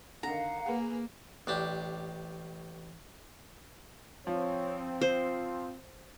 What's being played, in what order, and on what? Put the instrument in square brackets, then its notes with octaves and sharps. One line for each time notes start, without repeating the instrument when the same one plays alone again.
[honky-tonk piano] D3 D#3 [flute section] F5 F#5 [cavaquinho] A#5
[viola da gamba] A#3 [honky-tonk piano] G#4 B4
[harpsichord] A1 D4 G4
[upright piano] F3 [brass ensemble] C4 [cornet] C#5
[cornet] F4 [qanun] C5